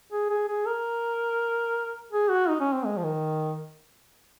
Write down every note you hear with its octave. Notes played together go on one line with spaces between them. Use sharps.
G#4
G#4
G#4
A#4
G#4
F#4
D#4
C#4
C4
G#3
F3
D#3